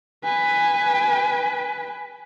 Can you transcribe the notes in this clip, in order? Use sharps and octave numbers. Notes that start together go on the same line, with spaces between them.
B4 G#5